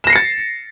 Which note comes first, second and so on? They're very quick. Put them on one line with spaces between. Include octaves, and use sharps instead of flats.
E7 A#6 C7 C#7 A6